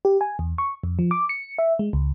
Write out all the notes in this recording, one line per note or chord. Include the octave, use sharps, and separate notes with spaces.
G4
G#5
E2
C#6
F2
F3
D6
C#7
E5
G#3
C#2